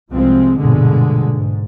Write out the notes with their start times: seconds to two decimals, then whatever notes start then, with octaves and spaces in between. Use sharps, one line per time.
0.11 C2 F3 G#3 C4
0.57 A#1 G2 B2 D3 G#3
1.31 G#2